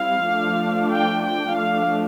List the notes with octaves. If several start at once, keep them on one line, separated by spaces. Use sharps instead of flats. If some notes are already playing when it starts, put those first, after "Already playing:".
Already playing: G3 C4 E4 F5
F3 A3 D4
G5
G5
F3 A3 D4 F5